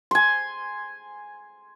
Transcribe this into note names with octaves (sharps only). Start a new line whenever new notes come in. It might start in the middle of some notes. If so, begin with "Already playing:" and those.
G#5 C6